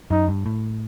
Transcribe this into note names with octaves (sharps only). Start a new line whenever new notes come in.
F#2 D#4
G2
A2